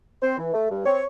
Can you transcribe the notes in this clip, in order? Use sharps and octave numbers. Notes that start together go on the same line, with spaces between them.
C4 C5
E3
A3
G2
C4 C#5